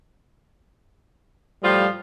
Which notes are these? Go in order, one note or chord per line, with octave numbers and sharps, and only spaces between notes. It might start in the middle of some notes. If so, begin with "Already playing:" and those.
A2 F3 G3 F4